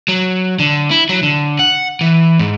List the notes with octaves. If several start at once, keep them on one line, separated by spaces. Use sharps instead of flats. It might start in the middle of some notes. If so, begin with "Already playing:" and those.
F#3
D3
E4
F#3
D3
F#5
E3
G#2